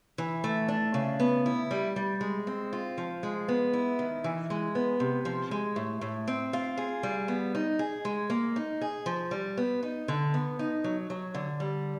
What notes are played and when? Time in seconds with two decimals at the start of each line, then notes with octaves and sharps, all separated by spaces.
0.18 E3
0.44 A3
0.68 D4
0.94 C#3
1.20 B3
1.46 E4
1.71 G3
1.96 G3
2.21 G#3
2.47 C4
2.73 F4
2.98 F3
3.23 G#3
3.48 B3
3.73 E4
3.99 D#3
4.24 E3
4.50 G#3
4.75 B3
5.00 C3
5.25 F3
5.51 G#3
5.76 A2
6.01 A2
6.28 C4
6.53 F4
6.77 G#4
7.03 G3
7.28 B3
7.55 D#4
7.79 G#4
8.05 G#3
8.30 A#3
8.56 D#4
8.81 G#4
9.06 F3
9.31 G3
9.57 B3
9.83 D#4
10.08 D3
10.34 B3
10.59 D#4
10.84 F#3
11.10 F#3
11.35 D3
11.60 G3